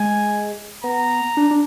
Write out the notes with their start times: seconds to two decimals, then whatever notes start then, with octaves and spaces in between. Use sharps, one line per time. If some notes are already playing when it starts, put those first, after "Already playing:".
Already playing: G#3 G#5
0.84 B3 A#5
1.37 D4
1.51 D4